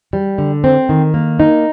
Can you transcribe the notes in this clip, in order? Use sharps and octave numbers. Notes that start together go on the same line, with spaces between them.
G3
D3
C4
D#3
A#3
D#4